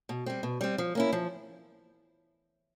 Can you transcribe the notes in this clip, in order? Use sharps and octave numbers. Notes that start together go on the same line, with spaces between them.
B2
G3 C4
B2
G3 C4
F3
A#3 C#4 E4
F3